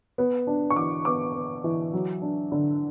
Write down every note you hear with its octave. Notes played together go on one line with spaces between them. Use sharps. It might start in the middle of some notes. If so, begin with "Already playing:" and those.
B3
D4
C#6
E3 D6
B3 D6
B3
E3
F#3
D4
D3